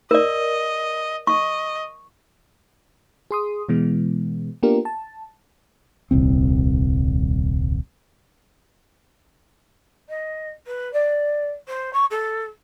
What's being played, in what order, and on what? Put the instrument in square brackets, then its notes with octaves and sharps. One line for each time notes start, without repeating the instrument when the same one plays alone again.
[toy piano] A#4 D5 [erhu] D#5
[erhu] D#5 [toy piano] C#6
[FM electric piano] G#4 C6 D#6
B2 E3 G#3 B3
A#3 B3 D4 F4 G4 A#4
A5
[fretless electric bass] D#1 C2 C4
[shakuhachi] D#5
B4
D5
C5
C#6
A4